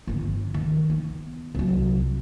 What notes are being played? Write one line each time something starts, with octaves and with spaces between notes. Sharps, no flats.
G1 D3
D#3
B3
C2 F#3